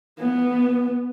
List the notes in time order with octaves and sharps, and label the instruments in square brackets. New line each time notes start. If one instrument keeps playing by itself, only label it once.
[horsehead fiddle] B3